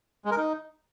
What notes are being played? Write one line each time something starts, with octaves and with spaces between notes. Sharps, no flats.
G#3
A#4
D#4